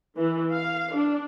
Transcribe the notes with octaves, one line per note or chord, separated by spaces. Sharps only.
E3
F5
D4